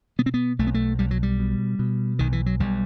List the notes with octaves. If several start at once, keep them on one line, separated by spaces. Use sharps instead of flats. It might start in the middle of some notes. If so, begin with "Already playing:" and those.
B2 B3
C4
B3
B1 A3
B3
A3
B1 G3
F#3
G3
B2
B2
B1 D#3
E3
F#3
B1 G3